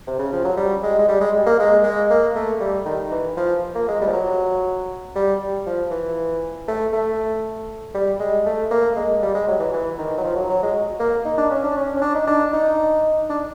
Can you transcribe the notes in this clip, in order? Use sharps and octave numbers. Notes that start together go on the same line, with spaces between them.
C3
C#3
F3
F#3
G3
G#3
G#3
G3
G#3
A#3
G#3
G#3
A#3
A3
G3
D#3
E3
F3
A#3
G#3
G3
F3
F#3
G3
F3
E3
A3
A3
G3
G#3
A3
A#3
G#3
G3
G#3
F#3
E3
E3
D#3
F#3
F3
F#3
F#3
G#3
A#3
D#4
D4
C#4
D4
C#4
C#4
D4
D#4
D4
D#4
D4